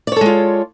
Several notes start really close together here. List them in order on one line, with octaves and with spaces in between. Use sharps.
D5 C#5 A4 G#3 F4